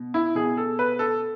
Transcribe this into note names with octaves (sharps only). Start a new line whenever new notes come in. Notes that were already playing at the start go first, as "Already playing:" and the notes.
Already playing: B2
E4
B2 G#4
A4
B4
A4